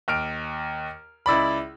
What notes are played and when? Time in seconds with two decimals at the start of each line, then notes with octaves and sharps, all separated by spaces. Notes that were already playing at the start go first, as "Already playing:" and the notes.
0.08 D#2 F6 D7
1.26 C#2 E4 D5 B5